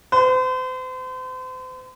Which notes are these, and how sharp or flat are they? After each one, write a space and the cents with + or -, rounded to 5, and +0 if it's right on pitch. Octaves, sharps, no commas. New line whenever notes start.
C5 -40